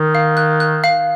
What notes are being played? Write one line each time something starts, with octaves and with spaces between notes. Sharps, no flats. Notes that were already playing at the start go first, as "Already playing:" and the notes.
Already playing: D#3
F5
F#6
F#6
F5